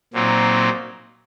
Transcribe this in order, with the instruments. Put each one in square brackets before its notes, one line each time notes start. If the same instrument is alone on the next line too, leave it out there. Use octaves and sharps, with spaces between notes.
[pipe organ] A#2 F#3 C4 D#4